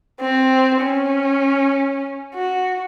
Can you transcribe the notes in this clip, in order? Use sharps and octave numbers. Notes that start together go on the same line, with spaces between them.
C4
C#4
F#4